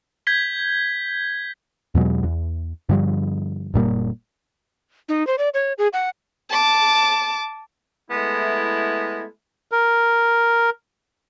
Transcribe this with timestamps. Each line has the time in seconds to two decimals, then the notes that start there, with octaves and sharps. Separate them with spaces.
0.27 G6 G#6 B6 G7
1.95 E2 B2 F#3 G#3
2.23 E2
2.89 G2 D3 F3 G3
3.74 F#1 A#2 G3 A#3
5.09 D#4
5.27 C5
5.38 D5
5.54 C#5
5.78 G#4
5.93 F#5
6.50 A5 D6
8.11 G#3 A3 B3 E4
9.72 A#4